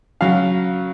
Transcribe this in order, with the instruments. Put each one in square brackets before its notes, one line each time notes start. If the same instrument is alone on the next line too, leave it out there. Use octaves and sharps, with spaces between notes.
[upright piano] C#3 F#3 F5